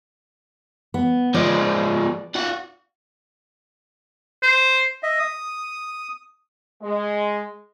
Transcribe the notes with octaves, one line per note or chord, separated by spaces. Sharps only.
B3
F3 G#3 D5
F4 F#5
C5
D#5 E5
D#6
G#3